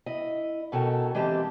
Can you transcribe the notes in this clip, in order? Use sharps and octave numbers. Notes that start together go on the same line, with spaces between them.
E4 D#5
B2 C#4 A4 A#4 G5 A5
E3 G#3 C4 G4 A5